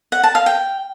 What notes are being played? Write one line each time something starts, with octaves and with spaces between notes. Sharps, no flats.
F#5
A5
F5
G5